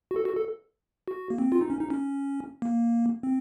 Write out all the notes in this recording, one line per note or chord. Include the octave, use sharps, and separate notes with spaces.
F#4
A4
F#4
A4
F#4
A#3
C4
F4
D#4
C#4
D#4
C#4
A#3
C4